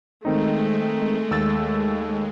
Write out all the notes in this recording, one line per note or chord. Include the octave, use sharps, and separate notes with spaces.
D#3 G#3 A3 C4 D#4
D#2 E6 A6